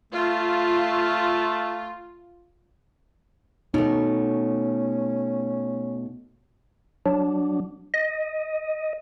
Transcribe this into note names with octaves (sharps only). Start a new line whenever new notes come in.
A3 F4
B2 A3 C#4 D#4
F#3 D4
D#5